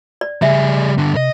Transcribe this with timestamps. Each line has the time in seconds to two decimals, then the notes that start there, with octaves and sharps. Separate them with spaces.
0.21 D5
0.42 C#3 G3 G#4 E5
0.98 G2 D3
1.16 C3 D#5